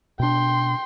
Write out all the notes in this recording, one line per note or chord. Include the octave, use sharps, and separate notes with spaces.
B2 D4 G5 C6